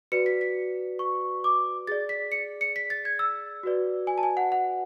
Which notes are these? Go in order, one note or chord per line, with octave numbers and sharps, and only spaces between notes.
F#4 B4 D5 C#7
B6
B6
C#6
D6
G#4 D5 A6
B6
C#7
C#7
B6
A6
G#6
E6
F#4 B4 D5
G#5
A5
G#5
F#5
F#5